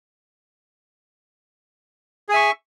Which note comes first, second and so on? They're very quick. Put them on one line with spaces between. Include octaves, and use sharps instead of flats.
G#4 G#5 E5 C#6